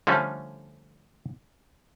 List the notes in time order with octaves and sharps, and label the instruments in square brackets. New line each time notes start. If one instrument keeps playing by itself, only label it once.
[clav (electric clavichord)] D3 F3 G3 A3 C#4